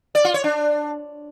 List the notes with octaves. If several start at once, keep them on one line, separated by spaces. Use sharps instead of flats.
D5
F4
C#5
D4